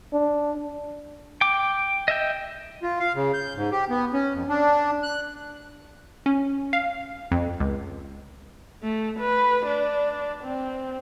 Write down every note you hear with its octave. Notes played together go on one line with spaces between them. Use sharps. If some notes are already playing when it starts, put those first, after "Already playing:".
D4
G5 D6
D#5 E5 G5
F4
F5
C#3
G6
G#2
G4
B3
C#4
F2
D4
F#6
C#4
F5
F2
C#2
A3
B4
D4
C4